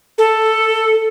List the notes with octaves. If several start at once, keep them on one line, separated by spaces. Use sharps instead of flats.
A4